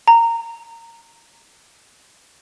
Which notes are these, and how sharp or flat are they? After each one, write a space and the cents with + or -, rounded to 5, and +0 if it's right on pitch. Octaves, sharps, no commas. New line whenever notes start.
A#5 -15